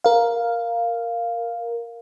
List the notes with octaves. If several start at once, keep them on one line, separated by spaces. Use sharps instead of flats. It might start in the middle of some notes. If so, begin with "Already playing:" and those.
A#4 F5